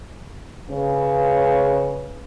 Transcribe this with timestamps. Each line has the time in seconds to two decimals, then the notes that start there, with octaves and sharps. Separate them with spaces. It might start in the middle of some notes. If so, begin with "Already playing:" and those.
0.69 C#3 B4